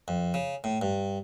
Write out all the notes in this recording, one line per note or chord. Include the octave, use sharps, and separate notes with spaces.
F2
C#3
A2
G2